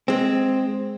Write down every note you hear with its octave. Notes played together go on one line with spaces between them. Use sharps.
G#3 C4